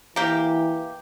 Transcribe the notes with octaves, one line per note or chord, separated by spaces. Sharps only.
E3 A#3 G4